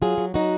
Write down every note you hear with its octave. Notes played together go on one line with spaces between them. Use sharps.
F#3 F4 G#4
F#3
F#3 D#4 F#4